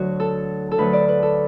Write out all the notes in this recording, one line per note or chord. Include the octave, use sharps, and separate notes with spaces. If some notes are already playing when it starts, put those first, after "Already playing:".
Already playing: D2 D3 F#3 F#4
A4
A4
D2 D3 F#3 B4
D5
B4
A4